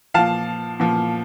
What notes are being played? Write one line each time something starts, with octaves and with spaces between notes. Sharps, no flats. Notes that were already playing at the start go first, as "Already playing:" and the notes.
A#2 F3 F5 A5
A#2 F3